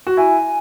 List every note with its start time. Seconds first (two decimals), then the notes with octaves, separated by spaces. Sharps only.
0.07 F#4
0.17 E4 G#5